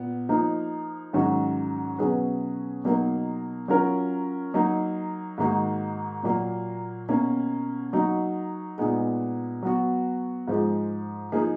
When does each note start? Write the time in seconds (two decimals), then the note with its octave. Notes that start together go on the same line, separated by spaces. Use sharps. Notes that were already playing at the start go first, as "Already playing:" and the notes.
Already playing: A#2 B3
0.29 F3 A#3 D#4
1.13 G#2 D#3 F#3 C#4 F#4
1.98 B2 F#3 C#4 G#4 B4
2.84 B2 F#3 A#3 D#4 A#4
3.68 F#3 C#4 F4 A#4
4.54 F#3 A#3 D#4
5.38 G#2 D#3 A#3 D#4 F#4
6.23 A#2 F#3 A#3
7.09 B2 A#3 C#4
7.93 F#3 A#3 D#4 F#4
8.78 A#2 G#3 B3 D#4 G#4
9.63 F#3 B3 F#4
10.48 G#2 F3 G#3
11.32 F3 A#3 D#4 G#4